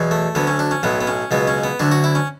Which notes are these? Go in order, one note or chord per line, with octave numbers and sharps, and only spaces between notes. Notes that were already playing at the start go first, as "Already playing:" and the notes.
Already playing: E2 B2 F#3
A3
D2 D3 F#3 B3
C#4
D4
C#4
B1 A2 F#3 B3
B3
C#4
C#2 B2 F#3 B3
C#4
B3
D2 D3 F#3 D4
F#4
E4
C#4